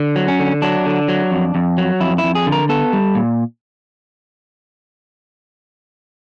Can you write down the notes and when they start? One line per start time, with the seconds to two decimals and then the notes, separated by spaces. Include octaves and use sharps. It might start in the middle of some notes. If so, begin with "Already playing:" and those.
Already playing: D3
0.16 F#3
0.28 C#4
0.39 D3
0.62 F#3 D4
0.86 D3
1.08 F#3
1.32 F2
1.55 F2
1.78 F#3
2.00 F2 E4
2.18 E4
2.24 F2
2.35 G#4
2.47 D3
2.52 A#4
2.69 B3 A4
2.93 G3
3.15 A#2